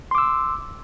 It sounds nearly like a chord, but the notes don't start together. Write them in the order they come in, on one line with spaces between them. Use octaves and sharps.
C6 D6 E6